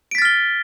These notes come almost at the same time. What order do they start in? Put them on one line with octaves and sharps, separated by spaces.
D7 B6 A6 F6 G7